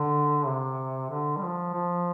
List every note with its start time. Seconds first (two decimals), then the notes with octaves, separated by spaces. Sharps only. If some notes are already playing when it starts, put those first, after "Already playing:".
Already playing: D3
0.47 C3
1.10 D3
1.37 G3
1.43 F3
1.74 F3